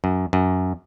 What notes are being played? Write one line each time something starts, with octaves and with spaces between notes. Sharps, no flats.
F#2
F#2